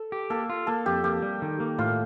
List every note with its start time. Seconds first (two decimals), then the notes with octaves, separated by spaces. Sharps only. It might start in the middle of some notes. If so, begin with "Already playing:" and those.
Already playing: A4
0.12 G4
0.30 A#3 A4
0.50 F4
0.67 A#3 A4
0.86 F2 G4
1.04 A#3 G4
1.22 G3
1.42 D#3
1.60 A#3
1.78 A2 F4